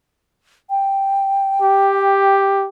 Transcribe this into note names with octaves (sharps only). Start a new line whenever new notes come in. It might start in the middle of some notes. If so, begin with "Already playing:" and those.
G5
G4